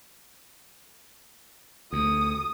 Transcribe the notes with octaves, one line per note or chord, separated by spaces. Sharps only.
D2 D#6